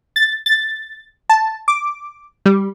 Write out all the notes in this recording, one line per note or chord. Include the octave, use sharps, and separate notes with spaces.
A6
A6
A5
D6
G3